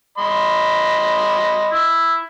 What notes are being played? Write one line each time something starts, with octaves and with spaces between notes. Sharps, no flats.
D#5 B5 C6
E4